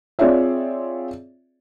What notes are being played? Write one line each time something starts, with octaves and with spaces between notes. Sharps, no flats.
C4 F4 G#4 C#5 D5 E5